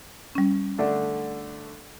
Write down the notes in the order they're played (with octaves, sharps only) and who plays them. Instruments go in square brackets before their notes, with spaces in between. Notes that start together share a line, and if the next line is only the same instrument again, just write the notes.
[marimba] G3 C#4
[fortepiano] D3 A3 D4